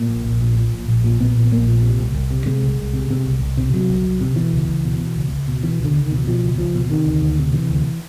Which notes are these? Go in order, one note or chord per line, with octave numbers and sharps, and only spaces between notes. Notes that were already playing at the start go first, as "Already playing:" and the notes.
Already playing: A#2 A#3
A#1
A#1
A#2
A#2
A#1
A#1
A#2
A#2 B3
A#1
A#1 A#3
A#2
C3
C2
C2
C3
C3 G#3
C2
C2
C3
C3
C2
C2
C3
C3 F#3
C2
C2
C3
B2 E3
C#2
C#2
B2
B2
C#2
C#2
B2
B2 E3
C#2 D3
C#2
B2 D#3
E3
B2 F3
C#2
C#2 F3
B2
C3 D#3
D2
D2
C3
C3 E3
D2